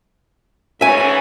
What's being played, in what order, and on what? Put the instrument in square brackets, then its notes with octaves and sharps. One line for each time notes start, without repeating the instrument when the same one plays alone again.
[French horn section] G#2 E3 C#4 [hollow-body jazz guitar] E5 G#5